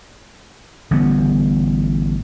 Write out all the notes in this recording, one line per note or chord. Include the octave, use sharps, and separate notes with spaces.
A1 D3 G3 B3